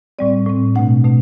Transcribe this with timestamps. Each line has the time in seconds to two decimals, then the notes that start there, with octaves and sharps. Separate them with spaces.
0.19 A2 G3 C4 D5
0.46 A2 G3 C4
0.75 B2 A3 D4 F#5
1.04 B2 A3 D4